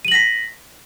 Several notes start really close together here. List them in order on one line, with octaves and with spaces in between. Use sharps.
D#7 F#7 A#6 B6